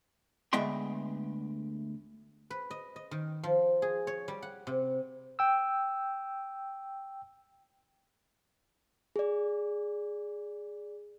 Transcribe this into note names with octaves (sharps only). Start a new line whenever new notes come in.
D2 G#3 B3 E5 G5 C6
B4
D#5
D#5
D#3
F3
G#4
C#5
G3
F#5
C3
G5 E6
G#4 D5